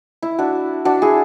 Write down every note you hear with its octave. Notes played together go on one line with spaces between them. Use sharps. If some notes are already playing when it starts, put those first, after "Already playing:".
E4
D4 F#4
D4 F#4
E4 G#4